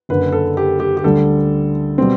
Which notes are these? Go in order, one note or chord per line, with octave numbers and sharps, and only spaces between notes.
F#1 F#2 D3 B4
A4
G4
G4
G4
D2 D3 G3 A4
B2 G3 C4